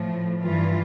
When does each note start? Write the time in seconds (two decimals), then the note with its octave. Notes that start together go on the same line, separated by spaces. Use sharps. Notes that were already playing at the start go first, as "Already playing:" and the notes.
Already playing: A2 F3
0.42 G2 E3 F4